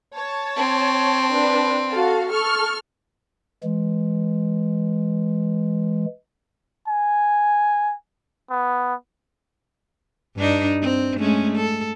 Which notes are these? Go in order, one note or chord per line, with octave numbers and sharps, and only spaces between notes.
C#5 A5
C4
D4 B4
F#4 A4 F5
A4 C#6 F6
E3 G#3
G#5
B3
G2 D4 D#4
C4
G#3 A3 C#4
A4